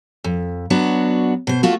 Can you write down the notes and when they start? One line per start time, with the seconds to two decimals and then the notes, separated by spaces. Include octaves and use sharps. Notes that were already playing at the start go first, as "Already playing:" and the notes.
0.24 F2
0.70 F#3 B3 D4 F#4
1.47 B2 C5
1.63 A3 F4 F#4